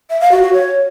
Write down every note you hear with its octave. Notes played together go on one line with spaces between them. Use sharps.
E5
F5
F#4
F#4
C#5